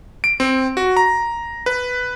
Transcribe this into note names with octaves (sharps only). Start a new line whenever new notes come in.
D7
C4
F#4
A#5
B4